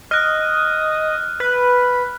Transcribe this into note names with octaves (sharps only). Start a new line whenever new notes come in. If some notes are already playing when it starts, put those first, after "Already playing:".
D#5 F6 F#6
B4